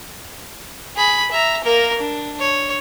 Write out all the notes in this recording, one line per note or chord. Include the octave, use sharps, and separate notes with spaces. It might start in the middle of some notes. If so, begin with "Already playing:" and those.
G#4 B5
E5 A#5
A#3 A#4
D4
C#5